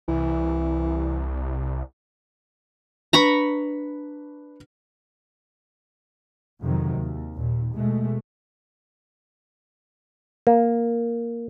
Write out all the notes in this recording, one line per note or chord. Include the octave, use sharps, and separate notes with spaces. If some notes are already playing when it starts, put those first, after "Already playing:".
C2 E3
D4 B4 A#5 B5 C#6
F2 C3 D#3 F#3
D#2
D#2 A#2
B2 G#3 A3
A#3